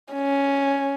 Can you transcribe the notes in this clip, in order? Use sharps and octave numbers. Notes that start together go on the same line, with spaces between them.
C#4